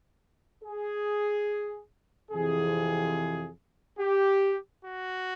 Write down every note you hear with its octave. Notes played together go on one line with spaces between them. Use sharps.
G#4
F2 C3 E3 G#4
G4
F#4